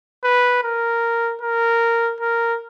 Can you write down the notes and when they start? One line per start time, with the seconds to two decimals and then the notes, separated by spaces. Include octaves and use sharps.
0.24 B4
0.63 A#4
1.41 A#4
2.20 A#4